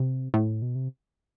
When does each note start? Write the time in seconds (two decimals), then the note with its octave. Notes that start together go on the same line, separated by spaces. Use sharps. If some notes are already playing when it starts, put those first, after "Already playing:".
Already playing: C3
0.34 A2
0.62 B2
0.75 C3